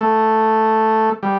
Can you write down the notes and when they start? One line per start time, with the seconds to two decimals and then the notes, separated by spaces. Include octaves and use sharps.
0.01 A3
1.23 G3